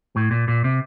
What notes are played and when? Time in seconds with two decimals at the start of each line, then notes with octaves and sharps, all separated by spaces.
0.16 A2
0.31 A#2
0.48 A#2
0.64 C3